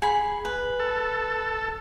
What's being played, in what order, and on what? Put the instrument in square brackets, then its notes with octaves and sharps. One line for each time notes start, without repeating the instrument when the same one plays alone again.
[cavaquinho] G#4 B5
B4
[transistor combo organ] A4